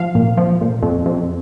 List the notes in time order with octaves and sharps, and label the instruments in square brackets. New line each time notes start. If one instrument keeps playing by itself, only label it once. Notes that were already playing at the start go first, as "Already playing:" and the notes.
Already playing: [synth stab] F3 F5
A#2
F3
A#2
F2
F2